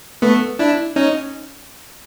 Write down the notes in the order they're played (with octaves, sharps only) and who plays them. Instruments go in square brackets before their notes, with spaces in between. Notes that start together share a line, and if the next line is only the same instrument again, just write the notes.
[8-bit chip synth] A3 B3
D4 E4
C#4 D#4